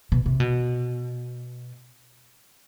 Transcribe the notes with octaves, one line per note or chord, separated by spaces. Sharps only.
B2
C3
B2